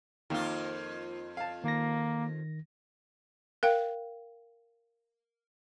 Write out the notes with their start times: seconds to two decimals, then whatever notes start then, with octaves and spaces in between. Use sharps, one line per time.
0.30 F2 D#3 A#3 F4
1.37 F5 A5
1.64 D#3 A#3 A#6
3.63 A#4 F5 G5